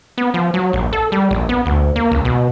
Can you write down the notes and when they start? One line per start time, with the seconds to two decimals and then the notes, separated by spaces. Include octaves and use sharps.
0.18 B3
0.34 F3
0.54 F#3
0.73 A#1
0.93 A4
1.12 G3
1.31 A#1
1.49 B3
1.66 D2
1.96 A#3
2.11 C#2
2.25 B2